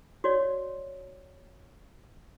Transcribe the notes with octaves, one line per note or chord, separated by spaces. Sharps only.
F#4 C#5 D5